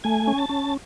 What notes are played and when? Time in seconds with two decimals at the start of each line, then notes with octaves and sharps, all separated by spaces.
0.04 A3 G#5
0.27 C#4
0.38 A5
0.49 C#4